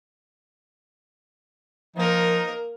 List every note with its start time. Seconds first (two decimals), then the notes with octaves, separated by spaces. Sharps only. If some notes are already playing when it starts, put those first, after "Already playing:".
1.96 F3 A#3 D#4 A#4